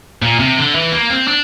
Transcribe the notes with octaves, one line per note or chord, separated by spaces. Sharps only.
A#2
C3
D3
E3
A#3
C4
D4